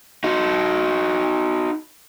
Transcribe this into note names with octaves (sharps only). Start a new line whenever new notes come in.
D#4 F#4